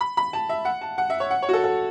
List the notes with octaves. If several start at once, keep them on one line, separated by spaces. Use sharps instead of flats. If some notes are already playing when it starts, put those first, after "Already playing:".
B5
B5
A5
E5
F#5
A5
F#5
E5
C#5
F#5
C#5
F#4
A4
A4